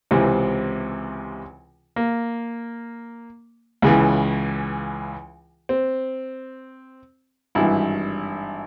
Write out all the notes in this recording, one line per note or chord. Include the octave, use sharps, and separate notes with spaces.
C#2 C3 E3 C4
A#3
C#2 C#3 E3
C4
G#1 G2 E3 E4